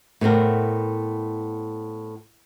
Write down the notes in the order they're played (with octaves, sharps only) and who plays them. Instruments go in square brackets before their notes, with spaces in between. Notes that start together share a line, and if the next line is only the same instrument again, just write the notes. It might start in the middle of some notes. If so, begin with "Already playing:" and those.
[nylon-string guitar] A2 B3 C4 A#4